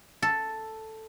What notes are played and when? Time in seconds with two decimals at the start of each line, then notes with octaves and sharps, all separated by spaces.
0.22 A4